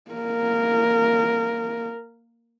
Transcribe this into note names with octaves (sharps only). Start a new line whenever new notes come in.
A#3 A#4